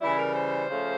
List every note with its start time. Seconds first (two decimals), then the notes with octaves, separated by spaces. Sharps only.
0.01 C#3 E3 G3 E4
0.19 A#4
0.35 C5
0.69 C#3 F3 A3 C#4